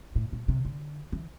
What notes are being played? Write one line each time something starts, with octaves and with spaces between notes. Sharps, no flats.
A2
A#2
C3
D3
E3